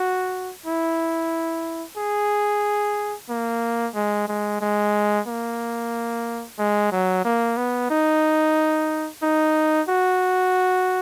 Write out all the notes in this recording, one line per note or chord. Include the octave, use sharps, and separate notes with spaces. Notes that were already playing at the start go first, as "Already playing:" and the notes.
Already playing: F#4
E4
G#4
A#3
G#3
G#3
G#3
A#3
G#3
F#3
A#3
B3
D#4
D#4
F#4